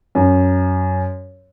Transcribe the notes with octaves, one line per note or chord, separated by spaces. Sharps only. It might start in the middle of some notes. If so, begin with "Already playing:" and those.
F#2